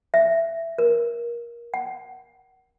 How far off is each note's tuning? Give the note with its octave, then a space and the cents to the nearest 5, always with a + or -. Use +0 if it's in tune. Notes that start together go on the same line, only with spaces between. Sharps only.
E5 +10
A#4 +20
F#5 +25